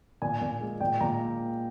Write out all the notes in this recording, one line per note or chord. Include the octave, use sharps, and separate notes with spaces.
A#2 G#5
A#2
G#3
A#2 G5
A#2 A#5